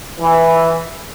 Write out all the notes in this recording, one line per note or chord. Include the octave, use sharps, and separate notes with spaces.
E3